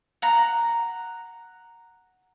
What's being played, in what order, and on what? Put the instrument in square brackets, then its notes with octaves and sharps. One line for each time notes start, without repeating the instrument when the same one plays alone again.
[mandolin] F#5 A#5